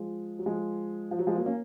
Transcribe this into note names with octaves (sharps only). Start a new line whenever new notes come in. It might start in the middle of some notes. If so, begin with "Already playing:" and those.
Already playing: F3 G#3
F#3
F3 G#3
F3
F#3
F3 G#3
F#3 A#3
A#3 C#4